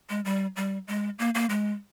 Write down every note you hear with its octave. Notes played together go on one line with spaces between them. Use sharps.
G#3
G3
G3
G#3
A#3
A#3
G#3